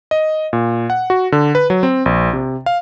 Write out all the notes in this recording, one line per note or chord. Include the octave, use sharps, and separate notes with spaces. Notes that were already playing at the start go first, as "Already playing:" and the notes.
D#5
A#2
F#5
F#4
D3
B4
F#3
C4
A#1
C3
F5